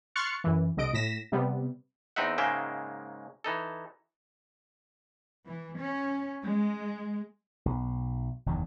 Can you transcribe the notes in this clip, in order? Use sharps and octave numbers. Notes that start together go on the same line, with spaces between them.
C6 C#6 F6 F#6 A6 C#7
F#2 E3
C2 D3 D#5 D7
A2 A#6 B6 E7
C3 G3 B3
E2 C4 D#4 D#5 E5 F#5
G#2 C#3 G#3 A#3 E5 G5
E3 D#4 A4
E3
C#4
G#3
B1
F#1 E2 G2 D#3